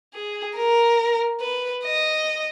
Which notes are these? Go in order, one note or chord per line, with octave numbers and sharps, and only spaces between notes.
G#4
A#4
B4
D#5